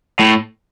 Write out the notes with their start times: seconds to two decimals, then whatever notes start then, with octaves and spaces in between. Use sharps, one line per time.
0.20 A2